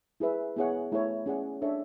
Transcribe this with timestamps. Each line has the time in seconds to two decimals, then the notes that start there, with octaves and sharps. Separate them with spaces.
0.20 E4 G#4 B4 E5
0.56 B3 E4 G#4 C#5 F#5
0.92 A3 E4 A4 C#5
1.26 C#4 G#4 D5 F#5
1.62 D4 A4 C#5 E5